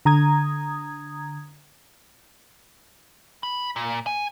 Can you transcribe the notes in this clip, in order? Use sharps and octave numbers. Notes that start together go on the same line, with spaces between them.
D3 A#5 D#6 G#6
B5
A#2
G#5